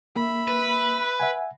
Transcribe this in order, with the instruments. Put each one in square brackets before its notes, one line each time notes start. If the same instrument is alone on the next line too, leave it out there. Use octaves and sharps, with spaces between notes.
[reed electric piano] A#3 [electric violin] E5 B5
[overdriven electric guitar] B4
[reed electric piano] E5 F#5 G#5